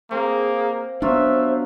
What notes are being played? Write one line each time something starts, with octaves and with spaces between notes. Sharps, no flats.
A#3 C4 G#4
F#3 B3 D4 F4 C5 E5